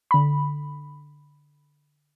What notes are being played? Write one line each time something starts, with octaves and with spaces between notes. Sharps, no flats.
D3 B5